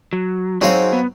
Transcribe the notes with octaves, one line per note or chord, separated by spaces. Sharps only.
F#3
F#3 C4 D#4 F#4 G#4 F5
B3